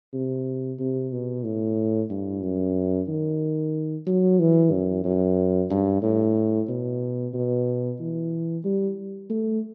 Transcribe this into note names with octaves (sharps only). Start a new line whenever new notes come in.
C3
C3
B2
A2
G2
F#2
D#3
F#3
E3
F#2
F#2
G2
A2
B2
B2
E3
G3
A3